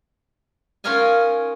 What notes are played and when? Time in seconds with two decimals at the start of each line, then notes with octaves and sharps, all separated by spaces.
0.84 C#4 D#4 F4 A#4 D#5 G#5